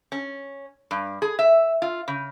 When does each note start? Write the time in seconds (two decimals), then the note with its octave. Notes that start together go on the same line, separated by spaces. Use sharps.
0.12 C#4
0.91 G2
1.22 G#4
1.39 E5
1.82 F4
2.08 C#3